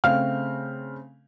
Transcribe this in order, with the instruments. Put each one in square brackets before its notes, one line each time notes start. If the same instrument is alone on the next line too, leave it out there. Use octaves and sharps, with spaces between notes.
[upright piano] C#3 A3 C4 [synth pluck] F5 [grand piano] F6